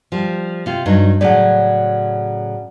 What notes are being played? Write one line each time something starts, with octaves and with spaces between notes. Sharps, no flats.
F3 G3
C3 F4
G2 F#3 D#4
A2 C#3 F#3 D5 F#5